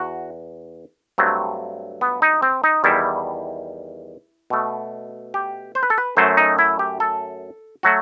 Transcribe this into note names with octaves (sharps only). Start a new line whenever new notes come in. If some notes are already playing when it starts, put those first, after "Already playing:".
Already playing: E2 F#4
G2 F#3 A3 C4
B3
D#4
C4
D#4
E2 D#3 G3 E4
B2 A3
G4
C5
B4
A4
B4
F#2 F#3 A3 C5
D#4
E4
G4
A4
F#3 A3 F#4